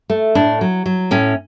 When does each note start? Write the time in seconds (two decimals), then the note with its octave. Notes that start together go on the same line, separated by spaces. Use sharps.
0.10 A3
0.35 A2 D4
0.61 F#3
0.86 F#3
1.11 A2 C#4